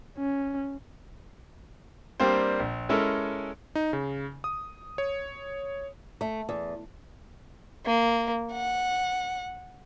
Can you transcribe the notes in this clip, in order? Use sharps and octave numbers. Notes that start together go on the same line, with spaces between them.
C#4
G3 A#3 C4 D4 C5
A#1
G#3 C#4 E4 A4 A#4
D#4
C#3
D#6
C#5
A3
E2
A#3
F#5